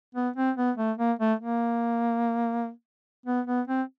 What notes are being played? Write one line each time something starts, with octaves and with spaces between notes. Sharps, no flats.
B3
C4
B3
A3
A#3
A3
A#3
B3
B3
C4